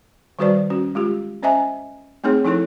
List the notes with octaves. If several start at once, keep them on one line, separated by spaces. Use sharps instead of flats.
D#3 G3 F#4 B4 C5 D5
C#4 F#4
G#3 F4 G4
C#4 C5 D#5 E5 G#5 A#5
A3 C4 D#4 G#4 C#5
F3 D#4 E4 A4 C#5